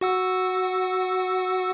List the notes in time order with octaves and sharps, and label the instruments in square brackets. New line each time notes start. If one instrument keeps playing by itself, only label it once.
[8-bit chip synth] F#4 F#5 E6